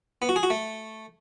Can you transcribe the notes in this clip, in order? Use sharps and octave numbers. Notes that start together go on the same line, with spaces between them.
B3
F#4
G#4
F#4
A3